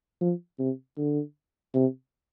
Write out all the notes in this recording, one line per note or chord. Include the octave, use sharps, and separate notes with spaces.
F3
C3
D3
C3